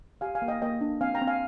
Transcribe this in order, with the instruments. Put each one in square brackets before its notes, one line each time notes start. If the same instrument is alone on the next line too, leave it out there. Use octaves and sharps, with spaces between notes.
[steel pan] G4 F5 G#5
F5 G#5
A#3
D#5 G5
A#3 D#5 G5
D4
C4 F5 G#5
G5 A#5
C4
F5 G#5